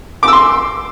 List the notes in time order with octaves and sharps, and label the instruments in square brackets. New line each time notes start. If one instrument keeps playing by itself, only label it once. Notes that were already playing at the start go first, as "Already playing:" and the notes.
[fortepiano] D6
E6
C6